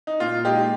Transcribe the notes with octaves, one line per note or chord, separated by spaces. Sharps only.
D#4
A#2 F4
G#3 D#4 G4